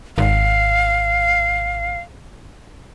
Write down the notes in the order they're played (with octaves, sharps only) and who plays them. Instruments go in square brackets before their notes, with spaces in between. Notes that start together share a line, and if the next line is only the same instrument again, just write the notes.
[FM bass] G#1 [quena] F5